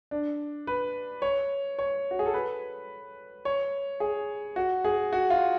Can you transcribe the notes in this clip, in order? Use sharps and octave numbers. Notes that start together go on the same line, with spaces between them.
D4
B4
C#5
C#5
F#4
G#4
A4
B4
C#5
G#4
F#4
G#4
F#4
F4